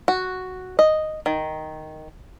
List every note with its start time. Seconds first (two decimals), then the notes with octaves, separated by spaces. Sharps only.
0.08 F#4
0.79 D#5
1.26 D#3